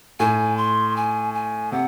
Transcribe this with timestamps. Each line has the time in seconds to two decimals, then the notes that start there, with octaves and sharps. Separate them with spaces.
0.20 A2 G#5
0.57 C6
0.96 G#5
1.34 G#5
1.72 C3 F#5